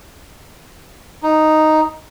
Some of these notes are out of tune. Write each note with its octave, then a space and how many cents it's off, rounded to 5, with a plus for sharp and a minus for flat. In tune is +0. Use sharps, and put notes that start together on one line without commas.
D#4 +0